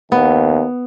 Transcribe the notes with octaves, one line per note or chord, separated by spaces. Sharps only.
D#2 B3